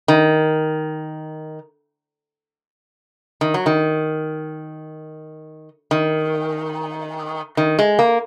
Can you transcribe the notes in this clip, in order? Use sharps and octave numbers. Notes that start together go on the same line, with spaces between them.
D#3
D#3
F#3
D#3
D#3
D#3
G#3
A#3